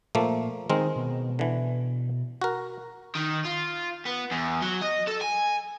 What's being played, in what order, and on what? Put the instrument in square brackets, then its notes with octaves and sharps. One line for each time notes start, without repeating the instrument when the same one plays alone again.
[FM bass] A#2 [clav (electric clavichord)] F3 A3 A#3
[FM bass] D#3 [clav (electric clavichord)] G#3 C4 A#4
[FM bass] B2
[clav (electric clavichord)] D3 E3
F#4 A#4
[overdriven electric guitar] D#3
F4
B3
E2
F#3
D#5
A4
G#5